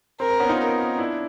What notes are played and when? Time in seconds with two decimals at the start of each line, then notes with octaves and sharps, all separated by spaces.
0.20 C4 A#4
0.30 C4
0.40 B3 C#4
0.49 D#4 F4
0.60 A#4
0.98 D4 E4